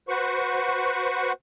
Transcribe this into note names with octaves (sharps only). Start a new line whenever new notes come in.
F#4 B4 C5 F#5 C#6